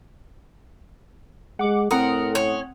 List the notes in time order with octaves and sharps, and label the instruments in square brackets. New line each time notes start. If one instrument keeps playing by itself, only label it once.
[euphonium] G#3 [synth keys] F#5 D6
[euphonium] A2 [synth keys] C4 F#5 D#6 [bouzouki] A#4
[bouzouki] C#4